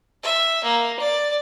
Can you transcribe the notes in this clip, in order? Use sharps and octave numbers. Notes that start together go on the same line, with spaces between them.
E5
A#3
D5